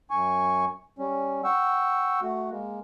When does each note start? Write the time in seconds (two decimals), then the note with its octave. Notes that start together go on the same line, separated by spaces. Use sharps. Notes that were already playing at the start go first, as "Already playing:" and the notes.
0.10 F#2 G#5 C#6
0.99 G3 C#4
1.44 F#5 G5 C#6 E6
2.22 A3 F#4
2.51 G#3 A#3